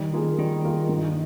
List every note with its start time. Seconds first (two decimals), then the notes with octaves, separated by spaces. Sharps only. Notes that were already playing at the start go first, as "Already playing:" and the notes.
Already playing: D#3 G3
0.13 A#3 F4 G#4
0.38 D#3 G3
0.64 A#3 F4 G#4
0.89 G2